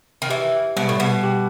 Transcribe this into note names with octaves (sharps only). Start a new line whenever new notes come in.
D#3
E3 G4
B2 G3
A2
B2
G4